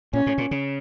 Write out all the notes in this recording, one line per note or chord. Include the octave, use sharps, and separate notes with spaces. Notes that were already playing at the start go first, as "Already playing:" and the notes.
A#2 C#4
A2
A#2
C#3